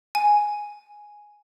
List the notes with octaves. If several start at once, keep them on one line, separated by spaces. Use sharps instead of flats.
G#5